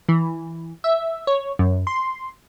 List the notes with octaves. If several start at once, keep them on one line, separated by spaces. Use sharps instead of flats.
E3
E5
C#5
F#2
C6